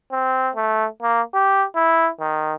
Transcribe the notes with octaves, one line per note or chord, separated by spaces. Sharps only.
C4
A3
A#3
G4
E4
D#3